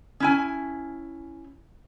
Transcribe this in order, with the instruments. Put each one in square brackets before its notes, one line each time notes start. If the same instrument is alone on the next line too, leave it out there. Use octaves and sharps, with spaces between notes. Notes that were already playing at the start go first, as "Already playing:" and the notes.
[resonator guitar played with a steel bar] C#4 E4 G#5